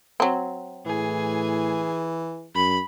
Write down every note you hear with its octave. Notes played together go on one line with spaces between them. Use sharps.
F#3 C4
A2 E3 G#4
F#2 B5